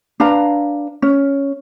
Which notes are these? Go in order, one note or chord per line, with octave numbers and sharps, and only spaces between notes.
D4 B4 F5 A#5
C#4